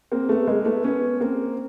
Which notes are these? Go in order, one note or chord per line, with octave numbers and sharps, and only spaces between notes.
A#3 C4
A3 B3
G#3 A#3
A3 B3
B3 C#4
A#3 C4